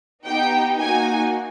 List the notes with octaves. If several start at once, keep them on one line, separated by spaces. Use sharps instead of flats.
B3 D#4 G4 G5
A#3 D#4 F#4 G#5